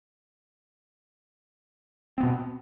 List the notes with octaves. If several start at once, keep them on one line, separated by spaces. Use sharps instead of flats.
B2 B3 C4